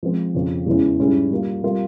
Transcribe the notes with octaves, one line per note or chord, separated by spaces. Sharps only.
F3 G#3 C4
F2 C#3 F3 C4
E2 C#3 E3 G#3 C#4
G#2 G3 C#4 E4 G#4
G3 A#3 F4
G3 C4 F4 A#4